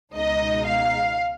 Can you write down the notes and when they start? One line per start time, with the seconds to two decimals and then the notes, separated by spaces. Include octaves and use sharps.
0.15 C#2 B2 G#3 D#4 D#5
0.65 F5